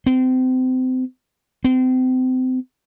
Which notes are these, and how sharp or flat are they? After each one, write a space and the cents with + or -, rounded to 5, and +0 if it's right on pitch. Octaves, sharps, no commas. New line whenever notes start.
C4 -30
C4 -35